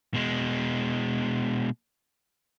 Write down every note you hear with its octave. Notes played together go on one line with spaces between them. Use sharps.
B2 G#3